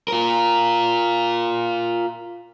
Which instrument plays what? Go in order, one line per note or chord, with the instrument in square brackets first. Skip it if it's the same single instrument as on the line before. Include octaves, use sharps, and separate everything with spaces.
[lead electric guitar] F4 A#4